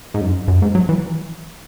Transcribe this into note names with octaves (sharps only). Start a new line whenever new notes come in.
G#2
F#2
F#2
G#2
F#3
E3